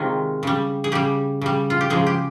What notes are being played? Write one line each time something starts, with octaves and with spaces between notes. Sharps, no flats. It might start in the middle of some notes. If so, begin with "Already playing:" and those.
Already playing: C3 D#3 G#3 F4
C#3 G3
G#4
C#3 G3 G4
C#3 G3
F4
G4
C#3 F3 G#3 G#4
G4